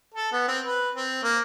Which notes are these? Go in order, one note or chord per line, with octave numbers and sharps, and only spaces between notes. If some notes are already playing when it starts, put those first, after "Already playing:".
A4
B3
C4
B4
C4
A#3